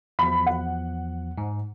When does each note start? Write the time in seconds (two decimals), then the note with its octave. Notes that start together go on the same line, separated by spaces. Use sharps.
0.19 E2 F3 B5
0.46 F#5
1.38 G#2